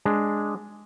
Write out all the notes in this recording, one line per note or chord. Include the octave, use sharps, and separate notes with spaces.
G#3 D4